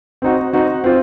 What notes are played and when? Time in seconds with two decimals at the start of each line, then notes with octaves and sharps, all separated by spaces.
0.22 C4 D#4 F#4
0.53 C4 D#4 F#4
0.84 C4 F4 C5